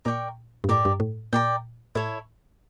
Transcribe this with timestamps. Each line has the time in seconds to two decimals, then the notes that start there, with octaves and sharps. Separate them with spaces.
0.05 A#2 A#4 D5 G5 C#6
0.64 G2
0.69 A2 G4 A#4 D5
0.85 G2
1.00 A2
1.33 A#2 A#4 D5 G5
1.95 A2 E4 A4 C#5